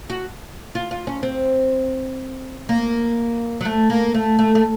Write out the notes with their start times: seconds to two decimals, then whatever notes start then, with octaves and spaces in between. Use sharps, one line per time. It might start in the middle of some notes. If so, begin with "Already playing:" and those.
0.10 F#4
0.75 F4
0.91 F4
1.07 C#4
1.23 C4
2.69 A#3
3.61 F#3
3.65 A3
3.90 A#3
4.14 A3
4.39 A3
4.55 A3